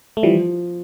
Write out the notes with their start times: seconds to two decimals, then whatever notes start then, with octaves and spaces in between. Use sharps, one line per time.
0.17 A3
0.23 E3 F3 G3